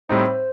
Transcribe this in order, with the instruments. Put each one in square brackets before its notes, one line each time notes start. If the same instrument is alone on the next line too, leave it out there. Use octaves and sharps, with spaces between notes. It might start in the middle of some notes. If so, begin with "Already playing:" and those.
[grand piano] A2 G3 C4 D#4 [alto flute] C5